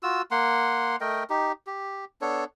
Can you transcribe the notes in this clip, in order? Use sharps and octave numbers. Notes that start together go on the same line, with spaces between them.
F4 F#4 E6
A#3 F#5 C6
A3 A#4 D#5 G5
D#4 G4
G4
B3 D4 A4 C#5